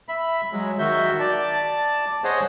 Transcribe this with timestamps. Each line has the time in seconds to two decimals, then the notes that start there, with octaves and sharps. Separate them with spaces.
0.09 E5 B5
0.52 F#3 G#3
0.79 D#3 F#4 E5 G6
1.20 D5 A5
2.24 G#4 C5 C#5 D#5 F#5